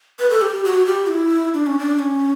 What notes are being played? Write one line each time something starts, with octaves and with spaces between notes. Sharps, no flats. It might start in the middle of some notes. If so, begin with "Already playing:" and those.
B4
A4
G4
F#4
G4
E4
D4
C#4
D4
C#4